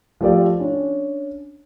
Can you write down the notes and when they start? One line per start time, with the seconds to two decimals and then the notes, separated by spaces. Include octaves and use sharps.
0.21 F3 A3 F4 G4 A4 D5
0.60 C#4 D4